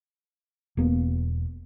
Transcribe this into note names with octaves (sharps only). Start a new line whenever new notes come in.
E1 A#3 B3